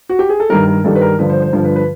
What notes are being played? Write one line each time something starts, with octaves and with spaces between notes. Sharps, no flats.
F#4
G4
G#4
A4
G2 D#3 G3 A#4
A#4
G2 D#3 G3 A4
B4
A#4
G2 D3 F3 B4
C5
C5
G2 D3 F3 C5
B4
B4